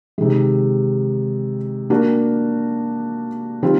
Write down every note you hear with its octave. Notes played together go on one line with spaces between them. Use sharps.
C3 D#3 G#3
A#3 D4 F#4 A#4
D#3 G3 C4 F4